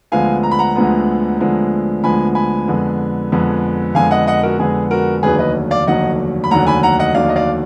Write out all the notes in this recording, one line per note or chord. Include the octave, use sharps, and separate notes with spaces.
D2 D3 F3 G#3 B3 F5 G#5
A#5
B5
F#5 A#5
D2 D3 F3 G#3 B3
D2 D3 F3 G#3 B3
D2 D3 F3 G#3 B3 G#5 B5
G#5 B5
F2 D3 G#3 B3
F2 D3 G#3 B3
F2 D3 G#3 B3 F5 G#5
D#5 F#5
D#5 F#5
F#4 A#4
F2 D3 G#3 B3 G#4
F#4 A#4
F1 D#2 D3 F#3 G#4 B4
B4 D#5
D5 F5
F1 D#2 D3 F#3 D#5 F#5
B5
F1 D#2 D3 F#3 F#5 A#5
G#5 B5
F#5 A#5
D#5 F#5
F1 D#2 D3 F#3 D5 F5
D#5
D5 F5